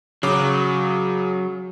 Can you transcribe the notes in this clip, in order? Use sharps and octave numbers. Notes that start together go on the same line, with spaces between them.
C#3 F#3 D6